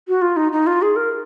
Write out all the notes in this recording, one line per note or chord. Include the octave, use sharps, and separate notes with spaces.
F#4
F4
D#4
D#4
F4
G#4
A#4